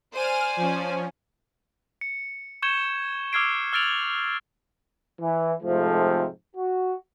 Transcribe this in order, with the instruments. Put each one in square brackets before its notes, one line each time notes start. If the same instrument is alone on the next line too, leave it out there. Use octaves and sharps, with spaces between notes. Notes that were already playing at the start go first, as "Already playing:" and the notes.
[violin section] C5 D5 G#5 [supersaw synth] F6 D#7
[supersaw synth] F3 C#4
[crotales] C#7
C#6 G6 G#6 C#7 E7 G7
D6 E6 F6 G#6 C7 D7
E6 F6 A6 D7 F7 F#7
[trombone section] E3
F2 G#2 C3 F3 A3
F#4